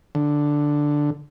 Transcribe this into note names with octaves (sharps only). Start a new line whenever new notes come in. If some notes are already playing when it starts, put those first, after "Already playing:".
D3